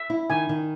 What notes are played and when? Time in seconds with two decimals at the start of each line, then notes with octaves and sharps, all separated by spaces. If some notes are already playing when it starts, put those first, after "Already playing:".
Already playing: E5
0.10 E4
0.30 D#3 G#5
0.49 D#3